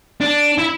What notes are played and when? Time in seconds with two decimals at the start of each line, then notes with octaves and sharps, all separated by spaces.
0.21 D4
0.58 E4